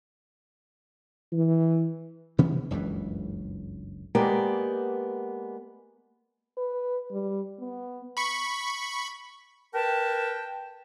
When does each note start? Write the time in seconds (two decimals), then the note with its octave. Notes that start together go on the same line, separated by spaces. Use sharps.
1.32 E3
2.38 C3 E3 B3 C#4
2.71 F#1 C#2 G2 E3
4.15 G#3 A#3 B3 G4 D5
6.57 B4
7.11 G3
7.60 B3
8.17 B5 C#6
9.74 A#4 B4 G5 A5